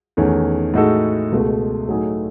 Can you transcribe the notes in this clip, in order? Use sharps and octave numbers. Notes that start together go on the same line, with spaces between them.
E2 D#3 A3 C#4
A2 G#3 D#4 F#4 A4
C#2 B2 A3
A2 F#3 A3 D#4 G#4